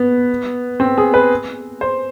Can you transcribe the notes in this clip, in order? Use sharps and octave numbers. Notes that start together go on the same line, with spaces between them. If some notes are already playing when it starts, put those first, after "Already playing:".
Already playing: B3
C4
G#4
B4
C5